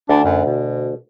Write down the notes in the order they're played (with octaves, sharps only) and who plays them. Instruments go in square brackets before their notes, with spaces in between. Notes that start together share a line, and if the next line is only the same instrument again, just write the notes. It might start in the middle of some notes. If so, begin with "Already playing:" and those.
[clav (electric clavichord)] D2 [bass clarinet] D4
[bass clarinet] F#2
B2